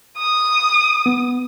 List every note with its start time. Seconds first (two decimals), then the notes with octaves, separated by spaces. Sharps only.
0.17 D#6
1.06 B3